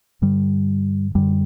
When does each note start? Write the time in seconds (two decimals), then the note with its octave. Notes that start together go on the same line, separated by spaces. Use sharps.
0.22 G2 D3 G3
1.15 F#2 D3 G3